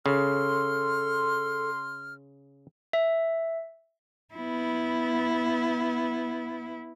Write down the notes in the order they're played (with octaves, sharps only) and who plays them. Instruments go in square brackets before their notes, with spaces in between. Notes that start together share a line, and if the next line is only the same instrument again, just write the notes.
[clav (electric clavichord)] C#3 [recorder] A4 [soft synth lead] C6 [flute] F6
[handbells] E5
[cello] B3 E4